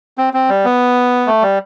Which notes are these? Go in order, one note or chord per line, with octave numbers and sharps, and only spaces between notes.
C4
C4
G3
B3
A3
G3